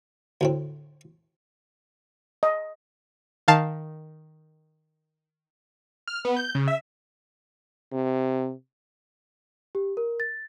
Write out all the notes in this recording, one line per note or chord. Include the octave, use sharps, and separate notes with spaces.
D2 A2 C4
D#5
D#3 F5 A5
F6
B3
G6
C#3
E5
C3
G4
A#4
A6